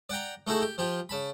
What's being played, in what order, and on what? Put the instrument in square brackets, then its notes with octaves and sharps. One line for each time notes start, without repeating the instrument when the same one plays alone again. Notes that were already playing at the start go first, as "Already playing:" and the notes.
[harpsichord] D5 F#5 G5 A#5
A3 D#4 E4 F#4 G#4 A4
G4
F3 F4 G4
C#3 A5 B5